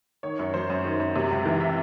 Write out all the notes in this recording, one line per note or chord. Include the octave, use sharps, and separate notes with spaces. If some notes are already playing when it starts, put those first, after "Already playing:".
D#3 C#5
F#2 C#5
F#3 C5
F#2
D#3
F#2
C3
C#2
E3
E5